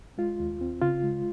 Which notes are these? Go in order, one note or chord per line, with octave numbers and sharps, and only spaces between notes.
G#3 F4
D#2
C4
C#3 F4
G#3